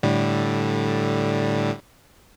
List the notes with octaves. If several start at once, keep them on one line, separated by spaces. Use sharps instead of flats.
A2 D3 G3